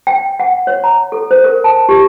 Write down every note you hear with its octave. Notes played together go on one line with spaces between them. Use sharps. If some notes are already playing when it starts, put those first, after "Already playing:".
G5
F#5
C#5
A#5
A4
C5
A#4
A5
G4